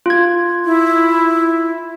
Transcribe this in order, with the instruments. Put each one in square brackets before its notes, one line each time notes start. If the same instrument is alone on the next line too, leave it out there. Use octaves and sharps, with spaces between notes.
[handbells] F4 G#6
[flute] E4